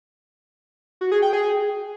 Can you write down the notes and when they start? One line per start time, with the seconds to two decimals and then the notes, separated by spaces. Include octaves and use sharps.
1.01 F#4
1.12 G#4
1.22 G5
1.33 G#4